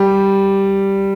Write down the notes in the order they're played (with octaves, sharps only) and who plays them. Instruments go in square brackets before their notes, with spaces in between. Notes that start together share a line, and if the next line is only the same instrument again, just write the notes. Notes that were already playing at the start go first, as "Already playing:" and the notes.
Already playing: [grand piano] G3